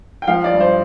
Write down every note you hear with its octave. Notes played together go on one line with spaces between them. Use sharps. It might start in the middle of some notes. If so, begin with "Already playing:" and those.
G5
F3 F5
D5
G2
C5